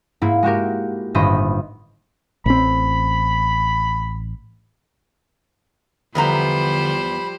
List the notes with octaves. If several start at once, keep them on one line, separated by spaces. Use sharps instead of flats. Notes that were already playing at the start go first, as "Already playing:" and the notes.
G#2 A#3 E4
G#3 F#4 G4 A#4
G1 A2 D#3 C5 D#5 B5
A1 C4 B5
E2 D3 F3 G3 B3 C5 A#5 B5